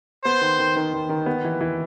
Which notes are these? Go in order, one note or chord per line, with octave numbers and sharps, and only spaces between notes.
B3 C5
D#3
D#3
D#3
D#3
D#3
B3
E3
E3